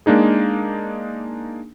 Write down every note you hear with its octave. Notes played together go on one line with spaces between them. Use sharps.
G#3 A#3 D4 D#4 G#4